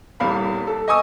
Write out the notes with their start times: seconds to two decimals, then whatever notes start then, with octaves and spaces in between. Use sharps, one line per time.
0.20 D#1 C2 F5 B5
0.67 A4
0.88 D#5 G#5 C#6 D#6 E6